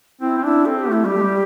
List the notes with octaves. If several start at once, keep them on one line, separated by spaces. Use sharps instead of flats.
C4 E4
C4
D4 E4
C4 A4
G4
A3 E4
G3 G4
A3
G3